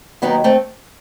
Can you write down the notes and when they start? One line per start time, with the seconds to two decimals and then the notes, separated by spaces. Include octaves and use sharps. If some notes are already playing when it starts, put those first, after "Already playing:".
0.22 D#2 D#3 F#3 B3 D#4
0.44 A3 C4